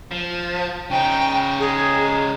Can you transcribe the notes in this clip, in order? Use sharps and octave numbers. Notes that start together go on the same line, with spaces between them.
F3
C#3 D#4 G5
G#4